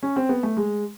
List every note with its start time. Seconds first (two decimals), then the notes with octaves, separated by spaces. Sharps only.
0.03 C#4
0.16 C4
0.29 B3
0.43 A3
0.57 G#3